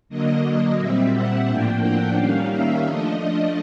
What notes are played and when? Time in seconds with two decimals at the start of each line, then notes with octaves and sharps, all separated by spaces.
0.09 D3 F#3 A#3 D#5
0.44 D#5
0.77 A#2 G3 C4 E5
1.12 F#5
1.46 A2 F3 A#3 D4 G5
1.81 F#5
2.15 D#3 G3 A#3 C#4 F5
2.50 E5
2.83 F3 A3 D4 D#5
3.18 D#5